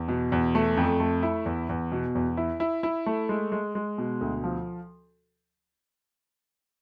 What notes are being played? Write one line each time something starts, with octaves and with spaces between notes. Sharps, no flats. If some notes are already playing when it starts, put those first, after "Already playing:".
Already playing: E2
B2
E2
A3
F2
A3
E4
E2
E2
B2
E2
E4
E4
E4
A3
G#3
G#3
G#3
B2
D2
F3